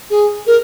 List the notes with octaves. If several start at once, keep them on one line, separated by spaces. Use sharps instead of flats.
G#4
A#4